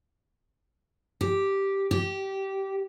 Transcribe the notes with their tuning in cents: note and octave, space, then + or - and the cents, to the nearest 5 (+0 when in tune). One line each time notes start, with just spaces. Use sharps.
G4 -5
G4 -15